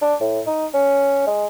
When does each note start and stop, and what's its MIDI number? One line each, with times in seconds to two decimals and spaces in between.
0.02 0.15 62
0.21 0.41 45
0.47 0.67 63
0.74 1.26 61
1.27 1.47 56